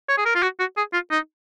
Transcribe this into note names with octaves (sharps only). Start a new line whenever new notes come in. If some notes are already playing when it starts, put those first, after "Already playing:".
C#5
G#4
A#4
F4
F#4
F#4
G#4
F4
D#4